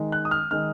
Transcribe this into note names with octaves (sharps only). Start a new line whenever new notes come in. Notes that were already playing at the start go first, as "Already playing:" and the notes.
Already playing: D#3 G#3 D#4
F#6
D#6
F6
D#3 G#3 D#4 F6